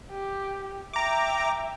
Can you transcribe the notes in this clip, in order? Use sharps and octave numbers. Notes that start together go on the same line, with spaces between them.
G4
E5 G5 A#5 D6